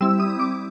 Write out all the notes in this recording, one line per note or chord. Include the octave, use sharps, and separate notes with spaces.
G3 C4 E4 E6
D#6
D6